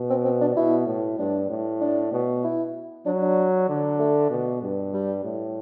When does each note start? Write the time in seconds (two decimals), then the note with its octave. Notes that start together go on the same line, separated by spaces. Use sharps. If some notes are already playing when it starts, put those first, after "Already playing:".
Already playing: B2
0.10 C4
0.25 C4
0.41 D4
0.56 B2 E4
0.87 A2
1.19 G2 D4
1.49 A2
1.81 D4
2.12 B2
2.44 E4
3.06 F#3 D4
3.21 D4
3.69 D3
3.99 A3
4.31 B2
4.62 G2
4.93 G3
5.24 A2